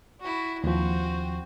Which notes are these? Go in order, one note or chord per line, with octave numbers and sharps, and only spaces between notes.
E4 F#4
D#2 F3 C4 F#4